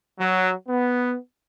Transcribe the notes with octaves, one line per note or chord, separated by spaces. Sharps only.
F#3
B3